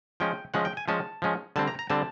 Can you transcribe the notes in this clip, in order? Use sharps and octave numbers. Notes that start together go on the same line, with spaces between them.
F3 G#3 C#4 G5
F3 G#3 C#4 F#5
G5
G#5
F3 G#3 C#4 A5
F3 G#3 C#4
D3 G3 C4 A5
A#5
A#5
D3 G3 C4 A5